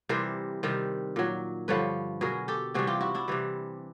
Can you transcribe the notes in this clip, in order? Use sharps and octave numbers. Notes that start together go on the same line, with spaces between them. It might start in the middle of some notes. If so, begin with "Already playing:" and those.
C3 E3 G3 A#4 C5
C3 D#3 G3
A#2 F#3
G2 D3 F3 B4 C#5
B2 F#3 G#4 A#4
G4 A4
C3 E3 G3 F#4 G#4
F4 G4
E4 F#4
D4 E4
C3 E3 G3